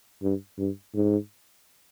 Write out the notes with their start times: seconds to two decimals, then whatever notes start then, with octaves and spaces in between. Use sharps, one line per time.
0.22 G2
0.58 G2
0.95 G#2